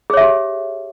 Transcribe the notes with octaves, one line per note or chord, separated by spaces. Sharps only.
G4 G#4 C#5 E5